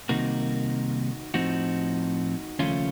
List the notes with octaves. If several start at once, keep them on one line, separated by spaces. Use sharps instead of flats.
C2 C3 D#3 A#3 D#4 F#4
A2 F3 C4 D#4 F#4
D#2 C#3 F3 A3 C#4 F4